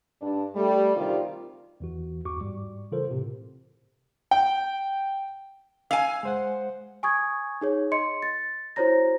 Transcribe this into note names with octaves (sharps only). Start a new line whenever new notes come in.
G2 D4
G3 A3
D2 C3 D#3 F4 G4 D5
E2 E3 F#4
E2 G2 F#4 C#6 D6
G#2 G3
C#3 E3 F4 A4 A#4 C5
A2 C3
G5
F5 G#5 E6
G#3 C5 F#5
G#5 C#6 D#6 G#6
D#4 G#4 C#5
D#5 C6 C#7
A6
E4 F#4 C5 C#5 A#5 A#6